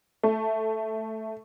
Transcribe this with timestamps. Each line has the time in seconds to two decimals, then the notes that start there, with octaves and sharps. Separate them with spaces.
0.23 A3